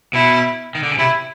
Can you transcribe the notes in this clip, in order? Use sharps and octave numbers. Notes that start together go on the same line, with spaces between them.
B2 E4
D#3
D3
C#3
C3 E4